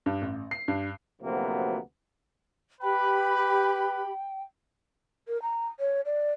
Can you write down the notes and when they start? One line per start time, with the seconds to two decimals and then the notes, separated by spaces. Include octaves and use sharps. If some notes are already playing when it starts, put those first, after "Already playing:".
0.06 G2
0.22 A1
0.51 C7
0.68 G2
1.22 D2 C3 F3 F#3 A#3 B3
2.82 G4 B4 G5 B5
5.27 A#4
5.42 A#5
5.80 C#5
6.05 D5